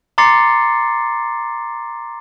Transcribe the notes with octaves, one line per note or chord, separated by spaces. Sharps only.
A#5 C6 D6 A6 C7 C#7